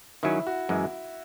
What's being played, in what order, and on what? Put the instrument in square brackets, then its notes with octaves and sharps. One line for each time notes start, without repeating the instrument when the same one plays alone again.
[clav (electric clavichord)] D#3 F#3 C#4 [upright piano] E4
[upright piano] F#4
[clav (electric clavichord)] F#2 E3 G#3